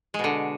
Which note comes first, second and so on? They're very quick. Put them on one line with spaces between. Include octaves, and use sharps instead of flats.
G#3 B2 D3